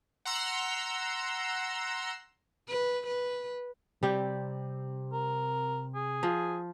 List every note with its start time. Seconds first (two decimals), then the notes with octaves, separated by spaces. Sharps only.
0.25 F#5 A#5 C6 E6
2.68 B4
3.07 B4
4.03 C3 G3 C4 G4
5.13 A#4
5.95 G#4
6.23 F3